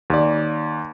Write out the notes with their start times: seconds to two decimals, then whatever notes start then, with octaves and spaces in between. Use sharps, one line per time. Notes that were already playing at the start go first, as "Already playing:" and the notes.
0.10 D#2 D5